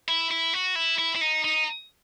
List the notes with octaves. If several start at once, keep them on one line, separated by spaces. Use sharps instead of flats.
E4
E4
F#4
E4
E4
E4
D#4
D#4